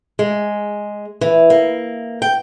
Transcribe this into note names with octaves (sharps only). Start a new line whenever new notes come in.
G#3
E3
A#3
G5